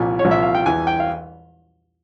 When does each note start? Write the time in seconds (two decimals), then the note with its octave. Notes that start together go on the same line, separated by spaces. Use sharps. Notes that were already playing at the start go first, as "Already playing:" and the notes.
Already playing: C2 A#2 F3 G#5
0.19 C#5
0.25 C2 A#2 F3
0.31 E5
0.42 F5
0.55 G5
0.66 E2 E3 G#5
0.87 G5
1.00 F5